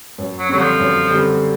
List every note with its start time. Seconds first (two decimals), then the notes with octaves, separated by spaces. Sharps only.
0.18 F#2
0.39 F#3
0.49 D3 F#3 G3 C4
0.59 F3
0.80 F#2
1.11 D3 G3 C4